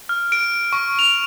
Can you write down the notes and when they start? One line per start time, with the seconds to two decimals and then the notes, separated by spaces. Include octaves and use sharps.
0.09 F6
0.32 D7
0.73 C#6
0.99 F7